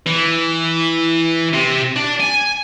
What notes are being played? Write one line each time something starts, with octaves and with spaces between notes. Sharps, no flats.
E3
C3
D4
G#5